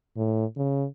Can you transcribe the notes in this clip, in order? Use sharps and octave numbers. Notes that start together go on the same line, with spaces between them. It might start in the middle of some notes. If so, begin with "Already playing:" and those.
A2
C#3